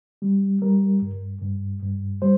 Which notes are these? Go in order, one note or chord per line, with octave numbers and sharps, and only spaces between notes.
G3
G3 A#4
G2
G2
G2
G3 C5